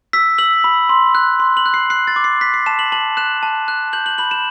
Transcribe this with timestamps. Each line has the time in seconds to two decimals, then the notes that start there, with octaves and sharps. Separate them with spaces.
0.13 E6 B6
0.38 E6 F#7
0.64 B5
0.89 C6
1.15 F#6
1.40 C6
1.57 F#7
1.66 F#6
1.74 C7
1.90 F#6 C7
2.07 A6
2.16 D6
2.24 C7
2.41 F#6 B6
2.54 C7
2.66 A5 E7
2.79 F#7
2.92 A5 F#7
3.17 F#6 E7
3.43 A5
3.68 F#6
3.93 G6 F#7
4.06 F#7
4.18 B5 F#7
4.31 E7